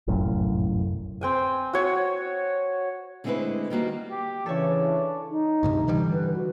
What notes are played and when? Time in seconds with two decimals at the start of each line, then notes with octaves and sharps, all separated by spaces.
0.07 F1 A#1 F#2 A2
1.21 C4 G5 G#5
1.73 F#4 C#5
3.24 D3 G#3 A3 C4 E4 B4
3.70 D#3 G3 A#3 F#4
4.11 G4
4.46 C#3 E3 D4 A4 C#5
5.31 D#4
5.63 D2 G2 C3
5.88 D3 E3 G3
6.13 B4
6.35 F#4